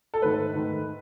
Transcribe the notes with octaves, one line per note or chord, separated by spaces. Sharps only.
A4
G#2 D#3 A3 B4
G#2 D#3 A3